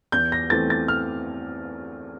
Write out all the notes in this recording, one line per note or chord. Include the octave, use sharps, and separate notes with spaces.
E2 G6
A#6
E3 A3 C4 A6
A6
F6